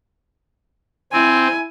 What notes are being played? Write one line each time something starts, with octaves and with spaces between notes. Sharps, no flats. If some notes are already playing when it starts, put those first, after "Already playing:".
C4 E4 G#5